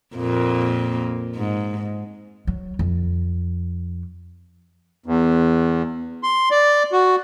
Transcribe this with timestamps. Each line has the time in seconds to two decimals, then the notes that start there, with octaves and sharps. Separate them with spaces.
0.16 F2 A#2 A#3
1.36 G#2
2.47 F#3
2.79 F2
5.06 E2
6.23 C6
6.51 D5
6.92 F#4